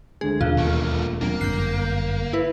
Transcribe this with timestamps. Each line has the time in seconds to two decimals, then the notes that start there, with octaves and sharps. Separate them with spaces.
0.21 D2 D3 G#3 G#4
0.41 E1 D#2 F4 F5 F#6
0.58 A3 A#3
1.21 F#3 A#3 C4 D4
1.41 G1 F#2 F#6 G6 C7
2.33 E4 B4